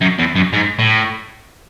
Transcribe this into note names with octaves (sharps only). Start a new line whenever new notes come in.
F#2
E2
F#2
G#2
A2